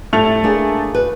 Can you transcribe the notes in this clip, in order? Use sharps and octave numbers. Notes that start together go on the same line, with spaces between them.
A2 G3 A3 F7
A#3 D4 G#4
F#4 B4